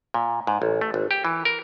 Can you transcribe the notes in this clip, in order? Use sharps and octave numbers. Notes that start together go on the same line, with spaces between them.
A#2
G#2
A1
A3
G#1
G4
E3
A#4